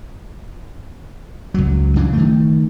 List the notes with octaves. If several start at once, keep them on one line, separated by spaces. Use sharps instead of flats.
C#2 F#3
C#3 E3 D4
D#3 A3